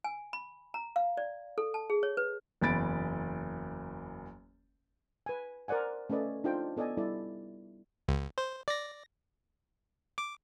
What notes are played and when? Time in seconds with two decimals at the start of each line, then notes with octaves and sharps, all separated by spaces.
0.04 G#5
0.33 B5
0.74 A#5
0.96 F5
1.17 D5
1.58 A4
1.74 A5
1.90 G#4
2.03 C#5
2.17 B4
2.62 F#1 E2 B5 A6 D7
5.26 B4 G#5
5.68 A#4 C5 D5 F#5 G#5
6.10 A3 C#4 A4 B4 D5 D#5
6.44 D4 D#4 F4 A4 C5 G5
6.77 B3 A4 D5 D#5 G#5
6.97 G3 E4 A4 D5
8.08 C#2
8.38 C5
8.68 D5 A#6
10.18 D6